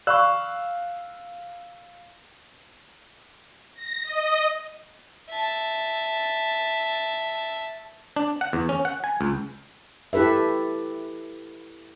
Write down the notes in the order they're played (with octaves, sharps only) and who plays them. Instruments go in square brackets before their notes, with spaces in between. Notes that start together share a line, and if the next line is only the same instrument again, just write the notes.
[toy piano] D5 B5 C#6 [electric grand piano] F5 E6 F#6
[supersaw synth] A#6
D#5
[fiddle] E5 A5
[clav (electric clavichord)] D4
F#5
E2
C#4
F#5
G#5
C#2
[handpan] E4 G4 A4 B4 E5